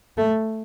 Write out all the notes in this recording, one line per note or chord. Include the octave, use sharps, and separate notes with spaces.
A3